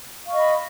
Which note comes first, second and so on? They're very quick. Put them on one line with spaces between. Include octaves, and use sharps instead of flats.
F5 C#6 D#5 B5